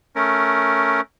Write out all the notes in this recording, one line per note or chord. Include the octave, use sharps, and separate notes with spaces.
A3 C#4 A#4